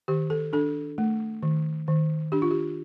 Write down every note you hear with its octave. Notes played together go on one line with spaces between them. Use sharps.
D#3 G4
A4
D4 A4
A3
D#3
D#3
D4 G4
F4
G4